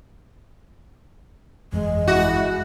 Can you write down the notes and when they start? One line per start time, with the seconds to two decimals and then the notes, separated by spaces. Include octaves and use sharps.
1.72 G1 F2 E3 G#3
2.08 E4 F#4